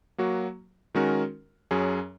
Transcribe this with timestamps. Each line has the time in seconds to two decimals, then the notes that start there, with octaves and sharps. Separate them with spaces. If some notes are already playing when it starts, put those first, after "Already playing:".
0.18 F#3 A#3 F#4
0.95 D#3 G#3 C#4 F#4 A#4
1.71 F#2 F#3 C#4 G#4